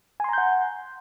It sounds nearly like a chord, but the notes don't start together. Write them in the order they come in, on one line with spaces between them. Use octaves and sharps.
G#5 C6 A#5 G6 F#5